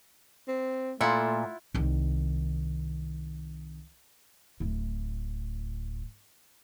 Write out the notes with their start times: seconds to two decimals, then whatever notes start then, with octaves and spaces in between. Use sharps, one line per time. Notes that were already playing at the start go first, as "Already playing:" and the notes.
0.48 C4
1.01 A#2 A3 E4 F4 F#5
1.74 C2 D#3
4.60 D1 A2